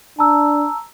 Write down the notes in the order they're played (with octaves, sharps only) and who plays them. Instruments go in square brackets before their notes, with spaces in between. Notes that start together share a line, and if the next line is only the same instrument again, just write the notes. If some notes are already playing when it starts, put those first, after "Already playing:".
[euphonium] D4 [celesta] A5 A#5 E6